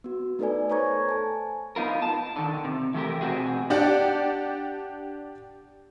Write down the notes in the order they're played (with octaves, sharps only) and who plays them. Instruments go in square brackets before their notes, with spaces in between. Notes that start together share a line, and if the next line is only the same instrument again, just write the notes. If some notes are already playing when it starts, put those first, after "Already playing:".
[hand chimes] B3 F#4
A3 D#4 A4 B4 D5 G#5
A4 C5 C#5 A#5 C#6 G#6
G#5 A5
[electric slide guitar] B3 D#4 F4 A#4
A5
D3 D#3
C3
E3 A3 G4 A#4
B2 C4 D#4 F#4 G#4
[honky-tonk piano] D4 G4 D5 F#5 A5